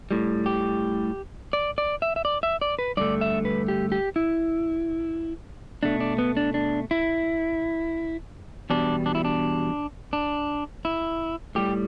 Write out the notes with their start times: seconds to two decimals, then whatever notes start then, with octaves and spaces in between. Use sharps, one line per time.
0.11 A2 G3
0.46 G4
1.53 D5
1.78 D5
2.02 E5
2.16 E5
2.25 D5
2.43 E5
2.61 D5
2.79 B4
2.97 G2 D3 A3 D5
3.21 E5
3.45 B4
3.68 G4
3.92 G4
4.16 E4
5.83 B2 A3 D4
6.00 D4
6.18 B3
6.37 D4
6.54 D4
6.91 E4
8.70 E2 B2 G3 D4
9.06 D4
9.15 E4
9.25 D4
10.13 D4
10.85 E4
11.55 A2 G3 G4